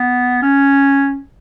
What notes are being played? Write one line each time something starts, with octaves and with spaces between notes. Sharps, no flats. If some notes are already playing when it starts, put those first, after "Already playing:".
Already playing: B3
C#4